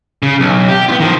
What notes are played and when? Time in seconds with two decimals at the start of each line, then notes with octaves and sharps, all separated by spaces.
0.23 C#3
0.40 B1
0.68 G4
0.89 B3 F4
1.00 D#3 F3